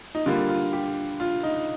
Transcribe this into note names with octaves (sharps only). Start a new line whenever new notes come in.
D#4
D3 G3 A#3 F4
F4
G4
F4
D#4